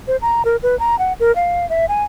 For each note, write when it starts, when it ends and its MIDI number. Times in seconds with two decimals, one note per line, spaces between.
0.08 0.17 72
0.22 0.42 82
0.45 0.56 70
0.63 0.78 71
0.79 0.98 82
0.99 1.13 78
1.20 1.34 70
1.36 1.68 77
1.70 1.86 76
1.89 2.04 80